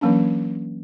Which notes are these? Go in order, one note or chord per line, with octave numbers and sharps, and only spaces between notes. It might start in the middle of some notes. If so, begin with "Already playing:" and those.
E3 F#3 A#3 C#4 D4